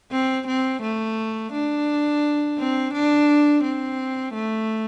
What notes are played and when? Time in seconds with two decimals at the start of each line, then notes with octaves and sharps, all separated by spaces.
0.11 C4
0.47 C4
0.82 A3
1.52 D4
2.58 C4
2.93 D4
3.63 C4
4.34 A3